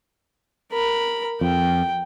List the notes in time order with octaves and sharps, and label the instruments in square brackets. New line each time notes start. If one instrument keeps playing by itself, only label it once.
[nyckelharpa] A#4 B5
[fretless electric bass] F2 [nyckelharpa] G5